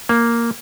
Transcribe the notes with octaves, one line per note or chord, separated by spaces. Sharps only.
A#3